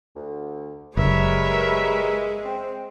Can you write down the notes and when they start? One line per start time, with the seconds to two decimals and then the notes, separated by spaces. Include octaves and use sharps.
0.16 D2
0.97 F#1 G3 G#3 A#4 B4 C#5 E5
2.45 C4